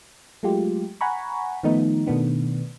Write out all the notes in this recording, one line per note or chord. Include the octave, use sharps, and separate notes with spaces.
F#3 G#3 A3 F4 G4
F#5 G#5 A#5 B5 C#6
D#3 F3 A3 B3 D#4
B2 D#3 A3 B3 D4